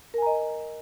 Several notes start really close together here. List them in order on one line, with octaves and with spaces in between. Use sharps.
A#4 G#5 A#5 D#5